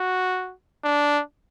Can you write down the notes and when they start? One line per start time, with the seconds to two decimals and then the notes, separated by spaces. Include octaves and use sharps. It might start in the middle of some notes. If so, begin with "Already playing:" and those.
Already playing: F#4
0.84 D4